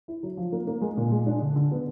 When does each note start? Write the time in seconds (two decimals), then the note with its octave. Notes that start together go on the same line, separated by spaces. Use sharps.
0.08 E4
0.23 F#3
0.37 F3
0.52 A#3
0.67 A#3
0.81 G#3
0.97 A#2
1.12 G#3
1.26 D4
1.41 D3
1.56 D3
1.71 B3